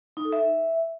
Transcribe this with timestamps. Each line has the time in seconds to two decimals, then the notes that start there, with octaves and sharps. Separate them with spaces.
0.17 D#4
0.25 A4
0.33 E5